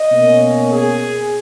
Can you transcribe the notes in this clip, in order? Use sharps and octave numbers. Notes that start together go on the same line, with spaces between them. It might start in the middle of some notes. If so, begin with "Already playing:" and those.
Already playing: D#5
B2 A#3 C#4
G#4